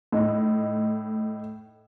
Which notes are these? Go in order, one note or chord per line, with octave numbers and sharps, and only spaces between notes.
A2 D#4